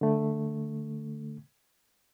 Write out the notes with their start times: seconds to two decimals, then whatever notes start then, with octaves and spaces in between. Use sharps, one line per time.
0.01 D3 A3